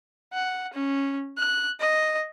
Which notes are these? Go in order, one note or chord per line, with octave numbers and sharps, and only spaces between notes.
F#5
C#4
F#6
D#5